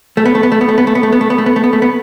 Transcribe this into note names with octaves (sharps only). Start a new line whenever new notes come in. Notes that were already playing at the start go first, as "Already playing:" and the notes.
A3
B3
A3
B3
A3
B3
A3
B3
A3
B3
A3
B3
A3
B3
A3
B3
A3
B3
A3
B3